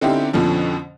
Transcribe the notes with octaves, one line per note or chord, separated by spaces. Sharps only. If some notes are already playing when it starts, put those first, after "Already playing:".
D3 C4 C#4 D#4 E4 G4
F2 B2 D3 F3 C#4